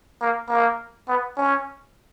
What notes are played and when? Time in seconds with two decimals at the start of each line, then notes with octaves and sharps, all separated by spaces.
0.21 A#3
0.49 A#3
1.08 B3
1.37 C#4